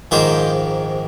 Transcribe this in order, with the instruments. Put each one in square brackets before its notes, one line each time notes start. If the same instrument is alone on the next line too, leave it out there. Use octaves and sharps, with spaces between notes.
[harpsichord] A#1 G#2 D#3 A#3 C5 D#5